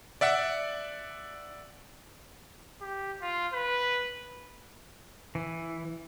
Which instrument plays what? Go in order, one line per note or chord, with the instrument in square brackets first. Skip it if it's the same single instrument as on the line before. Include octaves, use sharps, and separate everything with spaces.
[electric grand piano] D5 E5 F#5 E6
[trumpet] G4
F4
B4
[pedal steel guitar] E3